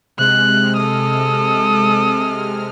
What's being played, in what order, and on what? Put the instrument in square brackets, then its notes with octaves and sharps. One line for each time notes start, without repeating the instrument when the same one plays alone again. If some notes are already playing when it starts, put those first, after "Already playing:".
[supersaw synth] C3 G#3 F6 [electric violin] F#6
[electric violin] A4 D#6